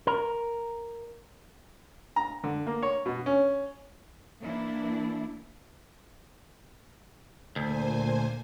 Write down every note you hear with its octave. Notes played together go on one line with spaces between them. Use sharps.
A#4
A#5
D3
A#3
C#5
B2
C#4
E3 A#3 D4 E4
D2 A#2 C5 G#5